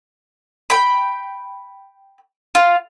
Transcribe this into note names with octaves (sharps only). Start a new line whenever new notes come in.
G5 B5
F4